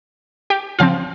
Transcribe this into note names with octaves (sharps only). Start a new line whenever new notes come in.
G4 G5
C#3 F3 C4 F4 F5